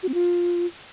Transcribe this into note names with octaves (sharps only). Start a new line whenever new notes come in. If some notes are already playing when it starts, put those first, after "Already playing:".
F#4
C4
F4